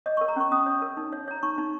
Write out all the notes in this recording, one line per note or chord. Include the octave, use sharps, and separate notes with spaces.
C#5 D#5
A#4 C#6
A#5
C#4 C#6
C#4 D#6
C#5
A#4
D#4
C#5
C#5 A#5
D#4 C#6
D#4